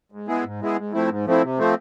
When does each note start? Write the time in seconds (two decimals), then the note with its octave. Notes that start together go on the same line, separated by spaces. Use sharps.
0.12 G#2
0.28 G#3 B3 E4 G#4
0.44 G#2
0.60 G#3 B3 E4 G#4
0.77 G#2
0.93 F3 A3 C4 E4
1.09 G#2
1.26 F3 A3 C4 E4
1.43 C3
1.58 F3 A3 C4